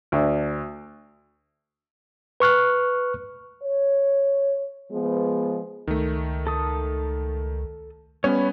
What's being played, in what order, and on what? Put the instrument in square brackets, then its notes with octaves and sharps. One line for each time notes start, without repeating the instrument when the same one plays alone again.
[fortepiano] D2
[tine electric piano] B4 C#6 F6 F#6
[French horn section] C#5
F3 G#3 B3
[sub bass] C#2 [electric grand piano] D#3 A3
[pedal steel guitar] A4 D#6
[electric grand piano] G3 B3 C#4 [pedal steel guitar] C#5 B5